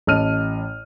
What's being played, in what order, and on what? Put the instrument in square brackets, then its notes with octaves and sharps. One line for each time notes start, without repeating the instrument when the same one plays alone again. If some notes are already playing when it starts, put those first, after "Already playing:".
[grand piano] A1 D#5 A5 F6 D#7